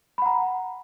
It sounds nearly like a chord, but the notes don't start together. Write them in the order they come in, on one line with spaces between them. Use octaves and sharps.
B5 F#5 A#5